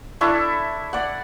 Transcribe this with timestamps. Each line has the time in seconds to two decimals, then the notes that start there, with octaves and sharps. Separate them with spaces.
0.21 D4 E4 A4 C#6
0.93 D5 F#5